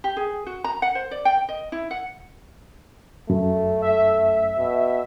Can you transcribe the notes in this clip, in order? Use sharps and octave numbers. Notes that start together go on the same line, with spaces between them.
G4
G#4
F#4
A#5
F#5
C5
D5
G5
D#5
E4
F#5
F#2 A3
E5
B2